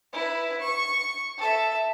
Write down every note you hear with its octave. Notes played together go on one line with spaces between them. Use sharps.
E4 B4
C#6
A4 E5